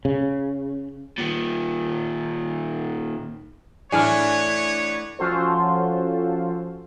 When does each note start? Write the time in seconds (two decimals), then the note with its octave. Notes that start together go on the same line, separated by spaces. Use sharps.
0.05 C#3
1.18 A#2 D#3
3.92 A2 E3 B3 D4 G#4 C#5 G#5 F6
5.19 F3 C#4 F4 F#4 A4 C5